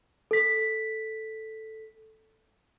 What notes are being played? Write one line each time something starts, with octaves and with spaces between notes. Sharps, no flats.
A4 B6